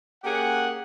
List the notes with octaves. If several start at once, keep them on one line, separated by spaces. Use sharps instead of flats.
A#3 C#4 G4 G#4 F#5